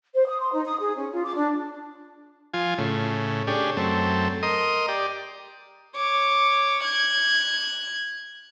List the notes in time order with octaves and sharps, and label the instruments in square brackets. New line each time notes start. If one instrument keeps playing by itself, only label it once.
[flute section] C5
D#6
C6
D#4
D#6
G#4
C#4
F4
D6
D4
[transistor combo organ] F3 F4 G#5
A2 C#3
C#4 D4 G4 G#4
F#2 A3 C4
A#4 D#5 C6 D#6
G4 D5
[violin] C#5 D6
F#6 G#6